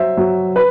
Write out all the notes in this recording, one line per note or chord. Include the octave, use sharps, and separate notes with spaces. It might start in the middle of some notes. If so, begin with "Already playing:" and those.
Already playing: F#3 C5 E5
F#3
B4